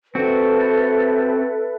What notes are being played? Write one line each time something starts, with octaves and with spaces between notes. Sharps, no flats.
C4 F#4 A4 B4 E5